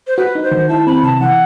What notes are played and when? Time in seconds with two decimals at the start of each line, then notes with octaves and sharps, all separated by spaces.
0.07 C5
0.17 F#4 B4
0.35 D#4
0.43 C5
0.51 D#3
0.69 E4 A5
0.86 C4 B5
1.03 C3 A5
1.20 E3 F#5